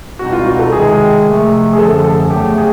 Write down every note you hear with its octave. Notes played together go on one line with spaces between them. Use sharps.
C#2 B2 G3 C4 D#4 F#4
F4
F#4
A4
C3 D#3 G#3 G#4
C3 F3 A3
G#4
F#2 D3 F3 A4
A4
E2 C#3 F#3 A3 G4
G#4